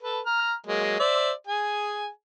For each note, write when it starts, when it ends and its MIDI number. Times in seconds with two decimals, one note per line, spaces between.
0.02 0.21 69
0.02 0.21 71
0.26 0.54 82
0.26 0.54 89
0.66 0.95 54
0.66 0.95 56
0.66 0.95 58
0.99 1.32 72
0.99 1.32 74
0.99 1.32 76
1.47 2.09 68
1.47 2.09 80